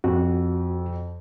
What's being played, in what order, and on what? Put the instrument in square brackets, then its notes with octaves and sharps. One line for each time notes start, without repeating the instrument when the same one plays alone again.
[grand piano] F2 [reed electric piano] F#4